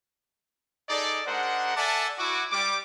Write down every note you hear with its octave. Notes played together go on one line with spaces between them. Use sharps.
D#4 G#4 A4 D5
G#3 D4 A#4 C5 F#5
A4 D5 E5 F#5 G#5 A5
E4 F#4 D6
G3 D6